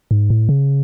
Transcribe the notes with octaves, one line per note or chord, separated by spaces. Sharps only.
G#2
A2
C#3